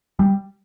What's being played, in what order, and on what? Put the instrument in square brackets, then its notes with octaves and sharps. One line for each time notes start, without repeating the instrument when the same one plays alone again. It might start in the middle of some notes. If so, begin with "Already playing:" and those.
[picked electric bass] G3